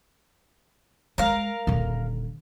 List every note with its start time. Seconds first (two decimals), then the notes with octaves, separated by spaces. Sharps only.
1.18 G#3 A#4 F5
1.67 D#1 D3